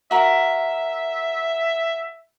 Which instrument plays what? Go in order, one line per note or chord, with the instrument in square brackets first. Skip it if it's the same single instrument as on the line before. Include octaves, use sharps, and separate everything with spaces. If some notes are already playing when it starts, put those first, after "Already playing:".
[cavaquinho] F#4 A#4 [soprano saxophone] E5